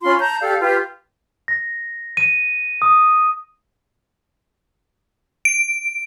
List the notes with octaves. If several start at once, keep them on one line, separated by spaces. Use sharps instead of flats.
C#4 F4 B5 C6
A5 A#5 G6
G4 A4 D5 F5
F4 G4 B4
A#6
D#7
D#6
D7